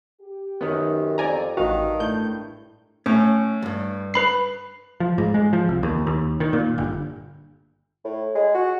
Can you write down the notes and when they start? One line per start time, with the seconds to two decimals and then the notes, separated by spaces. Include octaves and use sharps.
0.21 G4
0.61 F#2 D#3 B3
1.18 F2 D5 G#5 A#5
1.57 A1 G2 D#3 D4 F#4 F5
2.00 A2 G6
3.06 A2 C#4
3.62 E2 G2
4.14 B4 B5 C7
5.00 F3
5.18 G#2
5.34 G#3
5.53 F3
5.69 C2
5.83 D#2
6.07 D#2
6.40 D#3
6.53 A#2
6.78 G1
8.05 A2
8.35 G#3
8.54 F#4